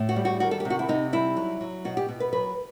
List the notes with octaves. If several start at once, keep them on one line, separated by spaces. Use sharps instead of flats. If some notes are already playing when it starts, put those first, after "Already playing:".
Already playing: A2
F#4
G3
F#4
D#3 F#4
A4
G4
C3
F#4
E4
C3 D#4
G3 E4
F#3
F#3
B2 F#4
G4
B2
B4
F#3 B4